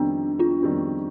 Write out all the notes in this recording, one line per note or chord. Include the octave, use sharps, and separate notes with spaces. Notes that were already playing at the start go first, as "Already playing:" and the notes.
Already playing: F2 D#3 G3 B3 C4 D4
D4 F4
F2 D#3 G3 C4